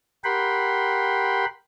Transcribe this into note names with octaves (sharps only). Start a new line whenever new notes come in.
G4 A#4 F#5 G5 B5 C6